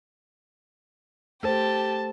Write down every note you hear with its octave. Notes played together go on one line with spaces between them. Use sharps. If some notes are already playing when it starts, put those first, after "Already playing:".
A3 G4 A4 C5 A5